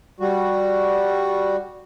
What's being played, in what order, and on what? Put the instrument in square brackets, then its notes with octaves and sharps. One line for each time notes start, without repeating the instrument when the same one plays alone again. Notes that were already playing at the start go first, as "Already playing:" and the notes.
[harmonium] G3 F#4